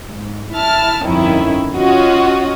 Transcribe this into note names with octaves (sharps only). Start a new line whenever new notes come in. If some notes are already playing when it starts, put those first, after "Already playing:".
G#2
E4 A5 F6
G1 F2 D#3 C#4 E4
C#4 F4 F#4 D#5